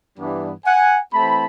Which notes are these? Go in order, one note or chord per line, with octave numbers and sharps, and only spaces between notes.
G2 E3 G3 B3 D4
F#5 G#5
E3 A3 C4 A5 B5